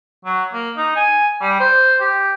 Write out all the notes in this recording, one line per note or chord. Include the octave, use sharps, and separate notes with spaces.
F#3
A#3
D#4
G#5
G3
C5
G4